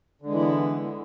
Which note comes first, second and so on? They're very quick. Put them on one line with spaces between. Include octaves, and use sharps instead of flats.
D3 G#3 E3 E4 B3